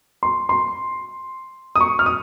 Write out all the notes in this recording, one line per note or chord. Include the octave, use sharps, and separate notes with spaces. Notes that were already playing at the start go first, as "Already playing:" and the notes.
C6
C6
D#6
C#6
F6
D#6